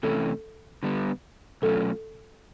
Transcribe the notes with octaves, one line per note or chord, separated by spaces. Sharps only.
C3 E3 A3 C#4 A4
D3 G3 B3
B2 F#3 A3 C#4 F4 A4